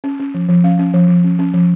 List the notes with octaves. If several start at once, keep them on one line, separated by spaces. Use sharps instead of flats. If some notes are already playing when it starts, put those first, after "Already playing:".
C#4
C#4
F3
F3
C#4 F5
C#4
F3
F3
C#4
C#4
F3